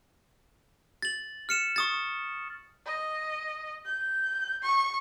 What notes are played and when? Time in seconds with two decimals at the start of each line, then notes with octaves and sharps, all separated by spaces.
1.02 A6 F#7
1.49 F6 C#7 E7
1.76 C#6 D#6 A6
2.86 D#5
3.85 G6
4.62 C#6